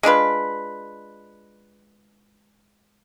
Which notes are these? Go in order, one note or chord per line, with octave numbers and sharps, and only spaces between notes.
G#3 D4 F4 B4